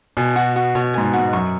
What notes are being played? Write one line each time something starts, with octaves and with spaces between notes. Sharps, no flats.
B2 G#5
F#4
F#4
B2 C#5
G#2 G#5
B2
F#4
G#2
F#2 C#6